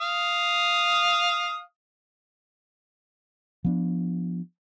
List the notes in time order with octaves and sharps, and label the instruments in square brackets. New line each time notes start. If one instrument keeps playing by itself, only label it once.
[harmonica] F5 D#6
[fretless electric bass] F3 B3 D4